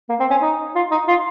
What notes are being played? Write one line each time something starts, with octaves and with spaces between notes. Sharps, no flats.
A#3
C4
C#4
D#4
F4
D#4
F4